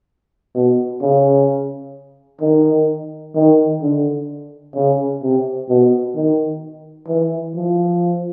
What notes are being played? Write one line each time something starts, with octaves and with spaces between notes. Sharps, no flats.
B2
C#3
D#3
D#3
D3
C#3
C3
B2
D#3
E3
F3